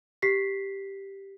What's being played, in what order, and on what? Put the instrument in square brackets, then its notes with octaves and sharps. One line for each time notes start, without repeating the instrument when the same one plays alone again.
[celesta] G4 B6 C7